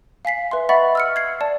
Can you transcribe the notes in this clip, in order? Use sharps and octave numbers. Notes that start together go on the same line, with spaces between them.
F5 G#5 B6 C7
B4 E5 C6
D#5 E5 F#5 B5 C#6 A6
E6 F6 C#7
G#6 C7
D5 A5